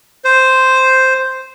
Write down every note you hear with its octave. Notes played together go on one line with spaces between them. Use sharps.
C5